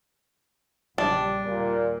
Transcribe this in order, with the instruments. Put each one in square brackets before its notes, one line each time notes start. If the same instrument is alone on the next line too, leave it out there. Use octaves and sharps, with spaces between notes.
[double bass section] A#1 C#3 G3 [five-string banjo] D4
[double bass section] D#2 [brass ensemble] A#2